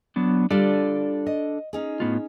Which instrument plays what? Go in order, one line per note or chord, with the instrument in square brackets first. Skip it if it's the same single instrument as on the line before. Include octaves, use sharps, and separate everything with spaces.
[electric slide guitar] F#3 B3 D4
[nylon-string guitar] G3 F4 [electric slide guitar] D4 A4 D5
[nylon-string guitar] D#5
C#4 D#4 G#4
[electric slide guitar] A2 B3 F4